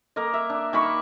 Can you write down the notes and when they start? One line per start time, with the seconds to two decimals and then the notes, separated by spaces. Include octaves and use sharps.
0.16 A#3 A#4 D#5
0.34 E5
0.50 D4
0.73 D#3 A#3 B5 C#6